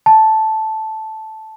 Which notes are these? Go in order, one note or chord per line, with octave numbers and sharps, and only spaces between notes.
A5